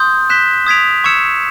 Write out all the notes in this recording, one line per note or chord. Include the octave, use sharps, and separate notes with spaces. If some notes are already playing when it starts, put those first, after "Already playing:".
Already playing: C6 D#6 G6
F#6 B6 E7 G7
D#6 G#6 B6 D7 F7
C#6 E6 G#6 C#7 E7